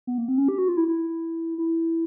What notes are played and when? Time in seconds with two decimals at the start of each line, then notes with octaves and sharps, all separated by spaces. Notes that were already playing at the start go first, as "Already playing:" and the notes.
0.07 B3
0.18 A#3
0.28 C4
0.38 C#4
0.48 G4
0.58 F#4
0.68 F4
0.77 E4
0.88 E4
1.58 E4